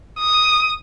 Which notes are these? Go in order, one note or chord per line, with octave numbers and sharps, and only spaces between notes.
D#6